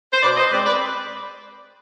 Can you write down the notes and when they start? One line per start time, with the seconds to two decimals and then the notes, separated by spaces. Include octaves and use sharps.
0.12 C5
0.22 B2 B4 D5
0.36 C5 D#5
0.51 G#3 C4 B4 D5
0.66 B4 D5